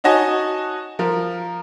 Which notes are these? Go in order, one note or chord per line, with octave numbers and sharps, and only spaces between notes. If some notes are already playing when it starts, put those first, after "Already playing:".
D#4 F#4 C#5 D#5 G#5 A5
F3 A#4